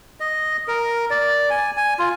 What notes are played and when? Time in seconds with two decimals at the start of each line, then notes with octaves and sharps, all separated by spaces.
0.20 D#5
0.68 A#4
1.10 D5
1.50 G#5
1.77 G#5
1.99 F4